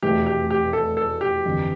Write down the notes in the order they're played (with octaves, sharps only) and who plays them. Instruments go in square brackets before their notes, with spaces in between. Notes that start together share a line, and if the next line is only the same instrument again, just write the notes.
[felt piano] F1 E2 B2 A3 E4 [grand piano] G4
[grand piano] G4
G4
A4
A4
G4
[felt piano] G1 F2 E3